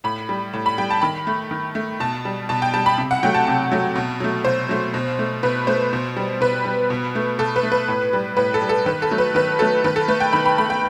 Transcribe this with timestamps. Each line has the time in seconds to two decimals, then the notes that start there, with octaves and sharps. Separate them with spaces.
0.04 A2 B5
0.29 G3
0.53 A2
0.66 B5
0.78 G3 G5
0.90 A5
1.01 D#3 B5
1.27 A3
1.51 D#3
1.75 A3
2.00 B2 A5
2.25 G3
2.49 B2 A5
2.62 G5
2.74 G3 A5
2.86 B5
2.98 C3
3.11 F#5
3.23 F#3 A3 G5
3.34 A5
3.47 C3 A5
3.72 F#3 A3
3.96 B2
4.20 F#3 A3
4.45 B2 C5
4.69 F#3 A3
4.94 B2
5.19 A3
5.43 B2 B4
5.67 A3 C5
5.93 B2
6.17 G3
6.41 B2 B4
6.65 G3
6.90 B2
7.15 A3
7.39 B2 A4
7.56 B4
7.63 A3
7.72 B4
7.88 A2
8.13 G3
8.37 A2 B4
8.54 A4
8.62 G3
8.69 A4
8.86 D#3 B4
9.02 A4
9.11 F#3 A3
9.18 B4
9.35 D#3 B4
9.59 F#3 A3 A4
9.84 D#3 B4
9.96 A4
10.08 A3 B4
10.20 G5
10.33 D#3 B5
10.46 B5
10.58 A3 B5
10.70 G5